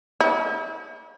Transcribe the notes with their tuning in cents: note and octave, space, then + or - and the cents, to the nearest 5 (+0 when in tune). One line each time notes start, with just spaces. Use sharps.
E4 -40